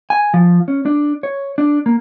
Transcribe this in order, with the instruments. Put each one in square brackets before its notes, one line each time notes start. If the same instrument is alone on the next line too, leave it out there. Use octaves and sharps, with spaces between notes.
[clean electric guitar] G#5
F3
C#4
D4
C#5
D4
A#3